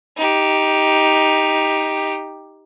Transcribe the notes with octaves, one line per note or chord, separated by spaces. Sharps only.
D#4 G4